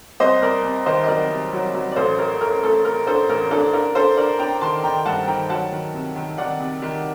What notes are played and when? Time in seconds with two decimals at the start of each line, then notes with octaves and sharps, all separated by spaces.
0.20 C2 C5 D#5
0.42 C2 A#4 D5
0.64 C3
0.86 D#3 C5 D#5
1.04 D#5
1.08 F#3 A#4 D5
1.30 C3
1.53 F#3
1.75 F#3
1.91 D5
1.96 A1 A4 C5
2.18 A3 A#4
2.41 A3 A#4
2.63 A3 A4
2.85 A3 A#4
3.07 D4 A4 C5
3.29 A1 A#4
3.51 D4 A4
3.73 D4 A#4
3.95 D4 A4 C5
4.17 D4 A#4 D5
4.39 D4 G5 A#5
4.61 D#3 A5 C6
4.84 D#3 G5 A#5
5.06 G2 F#5 A5
5.27 D#3 G5 A#5
5.50 F#3 F#5 A5
5.72 D#3
5.94 C3
6.16 D#3
6.38 D#3 D5 F#5
6.60 C3
6.82 D#3